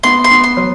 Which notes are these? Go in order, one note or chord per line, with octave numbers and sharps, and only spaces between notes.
B3 C6
C6
B3
C6
F#3